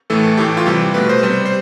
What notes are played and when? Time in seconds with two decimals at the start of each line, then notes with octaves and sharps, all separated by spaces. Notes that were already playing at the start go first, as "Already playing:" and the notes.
0.10 A2 E3 A3 A4
0.23 A4
0.37 A2 E3 A3 G4
0.57 F4
0.66 C3 E3 G3 G4
0.94 B2 A3 B4
1.09 C5
1.23 C3 G3 C5
1.46 C5